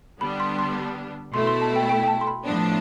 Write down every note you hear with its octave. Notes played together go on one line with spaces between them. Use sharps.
D3 G3 B3 D4 B5
C6
C6
B2 A3 E4 C6
C6
A5
G5
G5
G5
A5
C6
B5
A2 F3 B3 D4